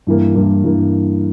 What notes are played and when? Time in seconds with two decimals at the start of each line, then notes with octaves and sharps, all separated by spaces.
0.07 G2 E3 A#3
0.35 G2 E3 A#3
0.64 G2 E3 A#3